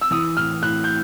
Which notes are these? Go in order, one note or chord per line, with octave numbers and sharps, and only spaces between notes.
E6
E3 D#6
A2 F6
A2 F#6
G6